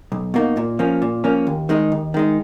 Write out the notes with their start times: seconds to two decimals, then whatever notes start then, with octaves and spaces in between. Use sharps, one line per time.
0.12 B1
0.34 B2 A#3 D#4
0.57 A#2
0.79 F3 A#3 C#4
1.02 A#2
1.24 F3 A#3 C#4
1.47 D#2
1.69 D#3 G#3 D#4
1.92 D#2
2.14 D#3 G#3 D#4